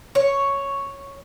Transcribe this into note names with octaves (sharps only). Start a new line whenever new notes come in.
C#5